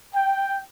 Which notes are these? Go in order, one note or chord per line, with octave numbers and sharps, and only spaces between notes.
G5